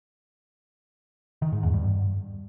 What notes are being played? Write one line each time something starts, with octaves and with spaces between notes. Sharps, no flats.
D#3
G#2
E2
G2